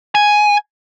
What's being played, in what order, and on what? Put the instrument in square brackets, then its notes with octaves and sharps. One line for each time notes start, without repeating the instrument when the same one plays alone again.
[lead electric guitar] G#5